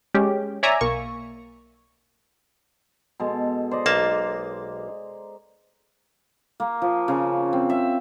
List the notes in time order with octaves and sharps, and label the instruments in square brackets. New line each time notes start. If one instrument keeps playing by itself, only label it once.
[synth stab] G#3 C#4 G4
C#5 D5 E5 G#5 A#5
B1 A#3 C#6
[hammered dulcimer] B2 G#3 A4
C5 D5 D#5
[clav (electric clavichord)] B1 A#3 A5 [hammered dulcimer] A#5 C6
[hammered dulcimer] A#3
F3
C#3
C4
E5